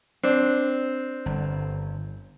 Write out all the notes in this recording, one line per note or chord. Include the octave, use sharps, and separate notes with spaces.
C4 D4
G1